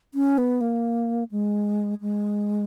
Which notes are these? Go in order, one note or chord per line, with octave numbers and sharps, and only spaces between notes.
C#4
B3
A#3
G#3
G#3